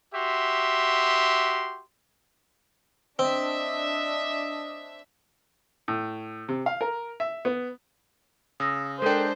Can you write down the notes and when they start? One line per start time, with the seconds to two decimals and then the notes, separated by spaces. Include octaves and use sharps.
0.14 F#4 G4 E5 C6
3.19 C4 D4 D#5 E5
5.88 A2
6.49 C3
6.66 F5
6.81 A#4
7.20 E5
7.45 B3
8.60 C#3 D#6 E6 A#6
9.02 G#3 D4 A4 A#4 C5 G5